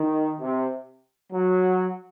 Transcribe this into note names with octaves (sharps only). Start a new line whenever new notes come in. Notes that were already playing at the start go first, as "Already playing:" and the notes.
Already playing: D#3
C3
F#3